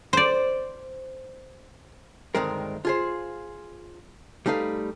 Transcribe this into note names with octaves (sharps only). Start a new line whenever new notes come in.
C5 D5
D2 G2 D#3 G#3 C4 A#4
F4 G#4 C5
G3 A3 D#4 B4 F5